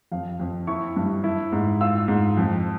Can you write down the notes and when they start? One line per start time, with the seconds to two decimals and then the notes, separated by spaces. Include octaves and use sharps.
0.12 F2 F5
0.39 F2
0.67 E4 C#6
0.96 G2
1.24 E4
1.52 G#2
1.81 F4 E6
2.08 G#2
2.37 F2